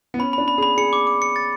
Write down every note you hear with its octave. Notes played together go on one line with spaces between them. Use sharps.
B3
C#4 B5
D4 B5
B5
G#4 B5
G#4 C#7
D6
D6
C#7
A6